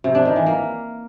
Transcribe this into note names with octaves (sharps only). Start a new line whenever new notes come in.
C3
D4
D#3
E3
A#3